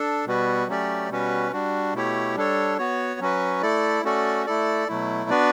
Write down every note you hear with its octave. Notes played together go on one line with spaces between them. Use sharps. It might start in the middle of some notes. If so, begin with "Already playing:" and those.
Already playing: D4 A4
B2 G3 B3 F#4 B4
F#3 A3 C#4 G4 D5
B2 G3 C#4 F#4 B4
G3 D4 F#4
B2 A3 E4 G4 C#5
G3 D4 A4 C#5
B3 F#4 C#5
F#3 C#4 F#4 B4
A3 E4 A4 D5
A3 C#4 F#4 A4 D5
A3 E4 A4 D5
B2 F#3 A3 E4
B3 D4 F#4 B4 D5